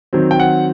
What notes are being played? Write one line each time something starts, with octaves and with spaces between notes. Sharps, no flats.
D#3 F#3 C4
G5
F#5